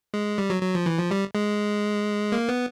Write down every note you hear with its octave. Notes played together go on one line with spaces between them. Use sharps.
G#3
G3
F#3
F#3
F3
E3
F3
G3
G#3
A#3
B3